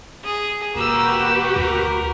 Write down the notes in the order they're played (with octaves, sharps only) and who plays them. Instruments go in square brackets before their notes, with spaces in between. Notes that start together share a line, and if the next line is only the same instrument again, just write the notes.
[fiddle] G#4
[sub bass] E1 [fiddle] A#3 E6 [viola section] F#4 G4 B4
[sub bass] D2 [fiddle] A#4